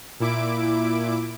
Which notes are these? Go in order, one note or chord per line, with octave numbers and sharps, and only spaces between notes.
A#2 E4 D6 D7